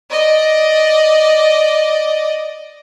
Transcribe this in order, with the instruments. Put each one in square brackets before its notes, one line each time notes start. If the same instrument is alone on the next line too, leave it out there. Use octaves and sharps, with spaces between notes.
[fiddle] D5 D#5